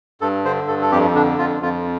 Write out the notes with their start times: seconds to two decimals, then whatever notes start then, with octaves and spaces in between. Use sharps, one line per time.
0.21 G2 A4
0.45 D3 C5
0.68 G2 A4
0.82 A4
0.91 F2 G4
1.15 D3 D4
1.38 F2 F4
1.62 F2 F4